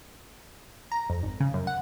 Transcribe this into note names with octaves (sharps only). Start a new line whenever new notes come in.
A#5
F2
G#1
C#3
F#2
F#5